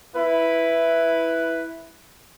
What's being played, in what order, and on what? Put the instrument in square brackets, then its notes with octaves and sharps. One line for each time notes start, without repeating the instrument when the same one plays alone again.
[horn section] E4 B4